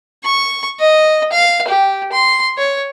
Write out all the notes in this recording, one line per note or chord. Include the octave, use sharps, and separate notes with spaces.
C#6
D#5
F5
G4
C6
C#5